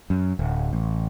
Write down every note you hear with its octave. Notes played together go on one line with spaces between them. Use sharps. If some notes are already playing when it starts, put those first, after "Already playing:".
F#2
D1
A1